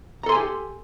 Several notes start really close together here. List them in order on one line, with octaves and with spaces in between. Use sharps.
A#5 A4 C6 G#5 G4